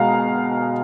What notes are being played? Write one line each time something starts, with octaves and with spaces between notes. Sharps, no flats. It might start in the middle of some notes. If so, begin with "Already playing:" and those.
Already playing: B2 G#3 F5 A#5